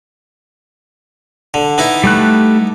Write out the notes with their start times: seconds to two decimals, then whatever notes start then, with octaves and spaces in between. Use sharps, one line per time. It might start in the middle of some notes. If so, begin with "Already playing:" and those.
1.54 D3
1.78 B3 D#4 E4
2.04 G3 A3 F#6